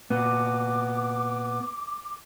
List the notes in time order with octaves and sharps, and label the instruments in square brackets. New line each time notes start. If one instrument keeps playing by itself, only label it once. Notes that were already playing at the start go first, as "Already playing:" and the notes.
[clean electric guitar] A#2 B3 [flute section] D6